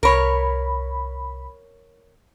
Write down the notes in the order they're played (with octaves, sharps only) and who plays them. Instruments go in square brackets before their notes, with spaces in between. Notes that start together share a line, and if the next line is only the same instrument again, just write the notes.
[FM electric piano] C2 B5 [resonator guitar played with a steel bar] A#4 C#5